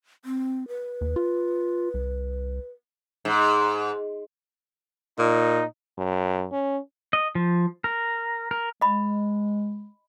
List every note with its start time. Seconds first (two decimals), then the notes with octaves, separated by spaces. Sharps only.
0.25 C4
0.68 B4
1.01 D#2
1.16 F4
1.94 C2
3.25 G#2
5.19 A#2 D#4
5.98 F#2
6.52 C#4
7.13 D#5
7.35 F3
7.84 A#4
8.51 A#4
8.81 G#3 D#5 B5